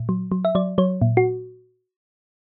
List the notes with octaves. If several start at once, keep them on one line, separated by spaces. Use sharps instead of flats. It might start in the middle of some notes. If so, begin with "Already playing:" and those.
Already playing: A#2
F#3
F#3
E5
F#3 D5
F#3 C#5
A#2
F#4